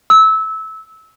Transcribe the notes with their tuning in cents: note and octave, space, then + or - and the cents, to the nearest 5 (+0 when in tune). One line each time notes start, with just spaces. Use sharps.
E6 -20